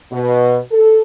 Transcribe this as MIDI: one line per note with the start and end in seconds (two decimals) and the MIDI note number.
0.12 0.58 47
0.71 1.01 69